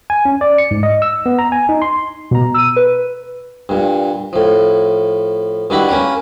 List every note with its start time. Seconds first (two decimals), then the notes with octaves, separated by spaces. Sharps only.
0.10 G#5
0.25 C#4
0.41 D5
0.58 C#7
0.71 G#2
0.83 D#5
1.02 E6
1.26 B3
1.39 A#5
1.52 G#5
1.69 D#4
1.82 C6
2.31 B2 A#5
2.54 E6 D#7
2.76 B4
3.69 G2 A#2
4.33 A2 F3
5.70 G2 D#3 D4 E4 F#4 B5
5.89 A#3 C#4 A#4 B4